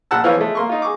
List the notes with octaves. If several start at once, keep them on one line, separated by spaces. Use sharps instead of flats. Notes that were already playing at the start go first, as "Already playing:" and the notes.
A#1 F#5 A5 E6
E3 F3 B3 F4 C#5
G#3 A3
A#3 C6 C#6
D#4 F4
G#4 C#6 D6